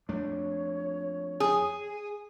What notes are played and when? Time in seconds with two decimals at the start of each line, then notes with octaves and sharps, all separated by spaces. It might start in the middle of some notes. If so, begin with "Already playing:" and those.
0.09 F2 A3 D4 C#5
1.40 G#4